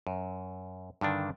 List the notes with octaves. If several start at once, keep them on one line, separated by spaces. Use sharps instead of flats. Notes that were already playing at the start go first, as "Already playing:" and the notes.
F#2
G2 D3 D#3 D4